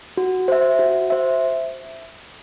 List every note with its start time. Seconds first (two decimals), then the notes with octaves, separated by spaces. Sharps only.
0.17 F#4
0.48 C5 E5
0.79 F#4
1.10 C5 E5